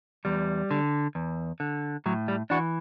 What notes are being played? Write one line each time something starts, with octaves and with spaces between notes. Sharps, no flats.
E2 G3
D3
E2
D3
A2 F#3
G3
E3 D4 F#4